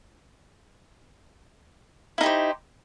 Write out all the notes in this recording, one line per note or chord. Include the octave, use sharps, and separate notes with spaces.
D#4 E4 G4 C5